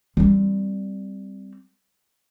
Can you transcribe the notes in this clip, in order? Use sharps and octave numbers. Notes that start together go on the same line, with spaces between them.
G3 C4